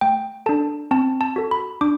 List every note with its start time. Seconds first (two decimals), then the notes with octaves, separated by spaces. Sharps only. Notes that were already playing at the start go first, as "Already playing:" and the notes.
0.01 A3 G5
0.46 D4 A4 A5
0.91 C4 A5
1.21 A5
1.36 F#4 A4
1.51 B5
1.81 D4 D6